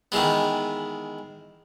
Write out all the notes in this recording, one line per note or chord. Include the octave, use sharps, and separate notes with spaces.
D#3 E3 G#3 B3